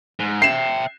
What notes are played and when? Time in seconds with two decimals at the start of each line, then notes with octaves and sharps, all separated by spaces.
0.20 G#2
0.42 E5 G5 C7 E7